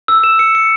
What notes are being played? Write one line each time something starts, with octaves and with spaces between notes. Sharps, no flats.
E6
E7
C#7
C#7